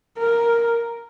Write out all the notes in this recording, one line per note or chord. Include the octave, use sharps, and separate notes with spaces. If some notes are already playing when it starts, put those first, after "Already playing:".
A#4